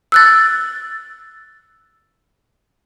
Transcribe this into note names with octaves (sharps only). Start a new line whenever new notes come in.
E6 F#6 A6